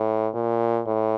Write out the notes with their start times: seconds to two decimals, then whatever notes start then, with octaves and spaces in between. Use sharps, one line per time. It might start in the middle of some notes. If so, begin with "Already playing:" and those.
Already playing: A2
0.34 A#2
0.87 A2